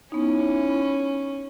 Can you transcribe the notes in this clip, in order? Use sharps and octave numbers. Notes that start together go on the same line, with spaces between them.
B3 C#4 D#4 E4